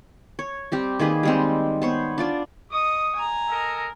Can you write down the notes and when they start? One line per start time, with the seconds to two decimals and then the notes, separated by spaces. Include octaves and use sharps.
0.39 C#5
0.72 G3 C4 G4
0.99 D#3 A#3 G#4 B4
1.23 G3 G#3 C4
1.82 B3 C5 C#5
2.18 D4 F4 D5
2.71 D#5 C#6 D#6
3.15 G#5 A#5
3.50 A4 A#4 D#5